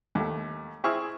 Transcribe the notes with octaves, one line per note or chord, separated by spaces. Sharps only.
D#2 A3
C4 E4 G#4 C#6 F6